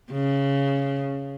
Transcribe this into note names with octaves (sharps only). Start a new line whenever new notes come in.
C#3